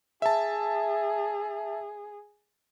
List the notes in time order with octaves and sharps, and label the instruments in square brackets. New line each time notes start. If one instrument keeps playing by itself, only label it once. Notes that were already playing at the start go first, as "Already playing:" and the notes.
[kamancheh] G#4 [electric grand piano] E5 A5